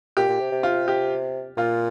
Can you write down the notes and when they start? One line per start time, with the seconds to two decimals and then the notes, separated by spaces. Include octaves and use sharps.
0.17 A#2 G4
0.29 A#2
0.40 C3
0.52 C3
0.63 F4
0.88 G4
1.57 A#2 F4